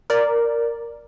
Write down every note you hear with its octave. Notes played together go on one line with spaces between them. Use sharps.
A#4 D5